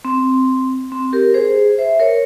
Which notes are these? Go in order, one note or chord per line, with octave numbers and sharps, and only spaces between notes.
C4
C4
G4 A#4
G#4 C5
C5 E5
A#4 C#5